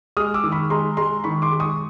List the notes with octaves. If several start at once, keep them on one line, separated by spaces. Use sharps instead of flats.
G#3 D#6 F6
D6 E6
D#3
B5 C#6
G#3 A#5 C6
G#3 A#5 C6
D#3 B5 C#6
C6 D6
G#3
C#6 D#6